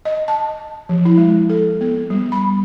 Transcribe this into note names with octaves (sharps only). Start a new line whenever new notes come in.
D#5
A5
F3
E4
G#3
A4
B3
G3
B5